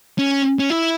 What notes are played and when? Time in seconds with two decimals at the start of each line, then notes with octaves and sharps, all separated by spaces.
0.18 C#4
0.59 C#4
0.70 E4